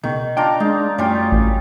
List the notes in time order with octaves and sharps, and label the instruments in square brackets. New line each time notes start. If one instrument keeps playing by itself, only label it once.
[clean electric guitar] C#2 B2 [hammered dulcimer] D#3
[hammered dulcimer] D4 F4 A#5 [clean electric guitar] G5
[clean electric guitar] G#3 D4 [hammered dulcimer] D#4
[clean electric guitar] F#2 A3 G5 [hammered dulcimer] G3 C#4 F4
[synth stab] A1